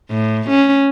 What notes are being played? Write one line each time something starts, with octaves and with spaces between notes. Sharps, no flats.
A2
C#4